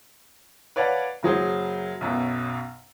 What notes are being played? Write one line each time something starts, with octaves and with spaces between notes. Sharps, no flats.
B4 C#5 D5 F5 F#5 A5
F#1 F#3 G#4 C5
B1 F#2 B2